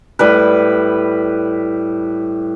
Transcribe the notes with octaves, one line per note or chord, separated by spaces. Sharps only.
A2 G3 B4